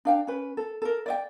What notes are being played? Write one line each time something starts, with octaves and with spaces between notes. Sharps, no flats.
D4 F5 G5
C#4 B4
A4
A4 A#4
D5 D#5 G5